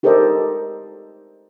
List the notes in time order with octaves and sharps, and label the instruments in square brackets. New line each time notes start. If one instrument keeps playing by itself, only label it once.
[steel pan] D#4 G4 A4 A#4 C5 D#5